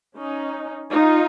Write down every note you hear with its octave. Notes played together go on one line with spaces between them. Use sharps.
C#4 D#4
D#4 F4